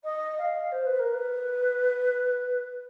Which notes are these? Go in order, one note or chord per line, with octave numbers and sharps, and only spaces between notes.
D#5
F5
C5
B4
A#4
B4